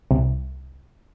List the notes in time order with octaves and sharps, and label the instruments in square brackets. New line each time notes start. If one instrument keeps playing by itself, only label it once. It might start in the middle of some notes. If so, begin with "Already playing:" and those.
[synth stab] C2